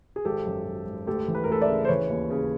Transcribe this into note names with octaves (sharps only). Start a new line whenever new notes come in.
G#4
G#1 G4 A4
F#2
G#1
G#1
D2 G4 A4
E3
B4
A#4
D2 A4 B4
D5 E5
C#3
C5
E3 B4 C#5
D#2
C#3